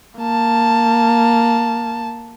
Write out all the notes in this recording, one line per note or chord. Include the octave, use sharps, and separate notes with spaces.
A#3 A5